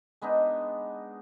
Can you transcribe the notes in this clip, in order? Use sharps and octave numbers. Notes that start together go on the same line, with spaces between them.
G#3 B3 D4 D#4